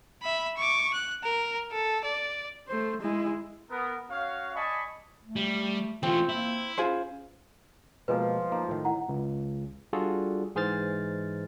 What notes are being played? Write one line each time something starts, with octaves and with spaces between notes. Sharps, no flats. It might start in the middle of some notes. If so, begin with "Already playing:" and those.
E5 B5
C#6 D6
F#6
A#4
A4
D5
A3 C5
G#3 E4
B3 A#4
C#4 F#4 C#5 F5
D5 D#5 G#5 A5 B5 C#6
A3
G3
E3 A3 C4 F4
A#3 E4
C#4 F4 G#4 C5
B2 F3 G#3 A#3 B4
A#3 D#4 A#4
A2 D#3
E4 F#5 A#5
C#2
G3 D4 F4 F#4 G#4 A4
G#2 E3 G#4 C5 F6 A6